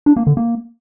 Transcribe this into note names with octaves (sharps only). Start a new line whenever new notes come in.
D4
A#3
D3
A#3